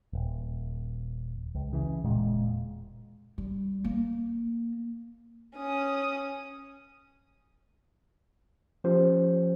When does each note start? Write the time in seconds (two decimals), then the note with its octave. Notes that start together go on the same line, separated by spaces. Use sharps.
0.13 D#1
1.55 C#2
1.73 C#3 E3
2.04 E1 A#2 G#3
3.38 G3
3.84 A#3
5.56 C#4 D#6
8.84 F3 C#4 G4 C5